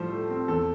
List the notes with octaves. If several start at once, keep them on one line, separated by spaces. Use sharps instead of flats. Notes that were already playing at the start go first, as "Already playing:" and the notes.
Already playing: A2 F3 G3 A4 C5
A3
C4
E2 A4